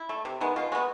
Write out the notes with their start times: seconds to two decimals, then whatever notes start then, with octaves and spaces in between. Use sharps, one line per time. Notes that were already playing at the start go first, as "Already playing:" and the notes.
Already playing: E4
0.09 A3
0.25 C3
0.41 D#3 G#3 B3
0.56 B2 F4
0.72 G#3 F#4
0.75 B3